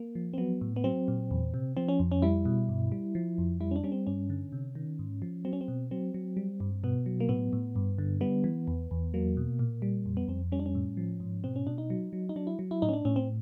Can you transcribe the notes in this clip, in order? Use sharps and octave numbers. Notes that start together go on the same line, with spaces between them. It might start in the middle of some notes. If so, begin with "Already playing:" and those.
Already playing: A#3
F3
C4
F#3 B3
A2
B3
F#3 C4
A#2
E2
C3
F3 C4
C#4
F2
C#4
G3 E4
B2
G2
G3
F3
F2
G3 E4
C#4
D4
G3 C#4
C4
G2 C#4
D3
C3
D#3
G#2
F3
F#3 C4
C#4
C4
B2
F#3 C4
F#3
G3
G2
B2 B3
F#3
A#3
A2 B3
A2
G2
D3
G3 B3
E3
E2
E2
F#3 A#3
B2
A#2
G3
F2
B3
F2 C4
G3 C#4
D4
C#4
A2
F3
G#2
B2 C4
C#4
B2 D4
D#4
F#3
F#3
D#4
F#3 D4
E4
F#3
E4
A2 D#4
C#4
D4
A2 C#4
C4